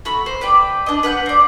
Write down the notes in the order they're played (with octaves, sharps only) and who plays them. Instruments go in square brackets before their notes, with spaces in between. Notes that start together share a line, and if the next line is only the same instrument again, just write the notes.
[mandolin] A3 F#4 B5 E6
C5
B4 D5 G5
D4 D#5
B4 F#5 F6 G6
C4 D5